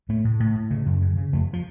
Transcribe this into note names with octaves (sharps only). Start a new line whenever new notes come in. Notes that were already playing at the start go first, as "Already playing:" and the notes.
A2 A3
A2
A2
A2
C#3
F#2
C#3
C#3
F2 A3
F3